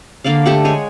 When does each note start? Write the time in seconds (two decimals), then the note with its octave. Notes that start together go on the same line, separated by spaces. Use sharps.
0.24 D3 A#3 D5 F5
0.45 A3 G4 F#5
0.65 G#3 C#5 G#5